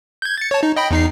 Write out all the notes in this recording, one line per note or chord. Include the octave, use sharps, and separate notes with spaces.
G6 G#6
A6 C#7
C#5 A5
D#4
D#5 G5 B5
E2 D#4 C7